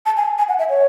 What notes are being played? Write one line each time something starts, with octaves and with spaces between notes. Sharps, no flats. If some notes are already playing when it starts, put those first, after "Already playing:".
A5
G#5
G#5
F#5
E5
C#5